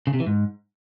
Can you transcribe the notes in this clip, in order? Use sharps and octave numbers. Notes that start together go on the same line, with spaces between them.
C#3
C3
E3
G#2